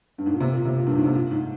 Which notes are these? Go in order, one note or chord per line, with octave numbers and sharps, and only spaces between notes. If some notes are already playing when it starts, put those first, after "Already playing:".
G2
G#2
A#2
C3
A#2
C3
A#2
G2
A#2
G#2
C3
A#2
G#2